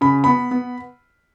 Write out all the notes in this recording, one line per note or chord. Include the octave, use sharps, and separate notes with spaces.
C#3 B5
B3 B5
B3